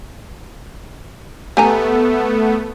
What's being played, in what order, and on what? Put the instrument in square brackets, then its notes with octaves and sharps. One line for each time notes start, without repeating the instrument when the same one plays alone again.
[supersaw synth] A3 B3 [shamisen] G4 G#5 A#5 [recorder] A4